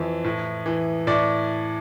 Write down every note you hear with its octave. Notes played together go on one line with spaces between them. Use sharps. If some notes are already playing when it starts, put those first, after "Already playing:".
Already playing: F2 E3
A2
E3
A2 D5